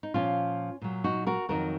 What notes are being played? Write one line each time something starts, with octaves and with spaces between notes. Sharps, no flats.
D#4
A#2 F3 C#4 F4
A#2 F#3
D#4 F#4
F#4 A#4
F2 D#3 F#3 F#4 A#4